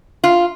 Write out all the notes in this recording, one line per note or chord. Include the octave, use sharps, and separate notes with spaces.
F4